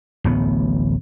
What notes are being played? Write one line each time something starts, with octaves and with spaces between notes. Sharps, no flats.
D1 A1 B3